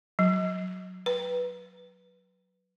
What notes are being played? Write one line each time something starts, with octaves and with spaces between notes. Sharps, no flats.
F#3
B4